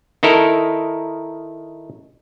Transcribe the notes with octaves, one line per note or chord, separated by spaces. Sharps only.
D#3 D#4 E4 A4 A#4